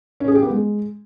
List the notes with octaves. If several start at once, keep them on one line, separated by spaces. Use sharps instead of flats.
C#4
G#4
G4
B3
G#3